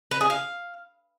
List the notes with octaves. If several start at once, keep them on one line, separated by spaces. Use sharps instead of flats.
B4
G#4
F5